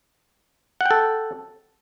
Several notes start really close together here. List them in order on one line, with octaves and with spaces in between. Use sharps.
F#5 G5 A4